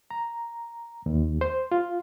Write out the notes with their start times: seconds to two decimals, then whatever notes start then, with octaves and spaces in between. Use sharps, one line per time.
0.11 A#5
1.06 D#2
1.41 C5
1.72 F4